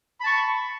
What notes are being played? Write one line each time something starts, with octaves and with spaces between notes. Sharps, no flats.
A5 B5 C#6